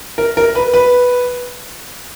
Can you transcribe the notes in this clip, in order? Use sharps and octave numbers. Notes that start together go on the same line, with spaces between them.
A#4
A#4
B4
B4